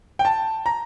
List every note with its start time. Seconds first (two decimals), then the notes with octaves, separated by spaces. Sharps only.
0.19 G5
0.25 A5
0.66 A#5